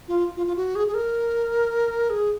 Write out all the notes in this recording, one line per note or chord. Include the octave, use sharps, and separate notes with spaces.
F4
F4
F4
F#4
G#4
G#4
A#4
G#4